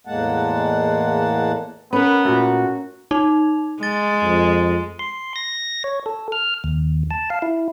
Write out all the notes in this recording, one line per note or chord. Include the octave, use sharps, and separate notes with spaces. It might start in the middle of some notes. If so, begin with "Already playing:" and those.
E2 A2 G#3 A#3 F#5 A5
B3 C#4 A#4 B4
A#2 A3 F#4
D#4
G#3 A6
F2
C6
A#6
C#5
A4
F6
D#2
A5
F5
E4